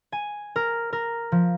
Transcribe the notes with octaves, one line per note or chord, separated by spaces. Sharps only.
G#5
A#4
A#4
F3